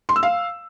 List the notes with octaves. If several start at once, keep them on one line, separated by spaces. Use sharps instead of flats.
C6
E6
F5